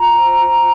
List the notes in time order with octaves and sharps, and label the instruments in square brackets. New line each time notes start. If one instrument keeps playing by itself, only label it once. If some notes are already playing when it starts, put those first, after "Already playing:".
Already playing: [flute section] F4 A#5
C5
F4